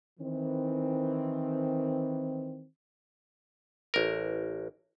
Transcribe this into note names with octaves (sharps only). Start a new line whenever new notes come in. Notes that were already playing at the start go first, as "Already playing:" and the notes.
D#3 E3 C4
A1 A#4